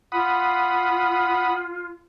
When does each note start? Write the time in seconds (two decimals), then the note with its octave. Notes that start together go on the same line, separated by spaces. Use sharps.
0.12 F4 F#5 B5 D#6